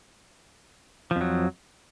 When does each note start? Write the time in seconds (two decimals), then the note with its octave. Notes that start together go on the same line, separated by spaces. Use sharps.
1.11 F3
1.16 F2
1.21 F#3